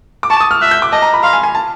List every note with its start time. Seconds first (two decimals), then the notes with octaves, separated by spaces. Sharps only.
0.23 D6
0.30 A5 C#6
0.40 D#6
0.51 F6
0.61 E5 F#6
0.71 G6
0.82 D6
0.92 D#5 A5
1.02 A#5
1.14 B5
1.23 F5 C6
1.33 G#5
1.43 G#5
1.55 A5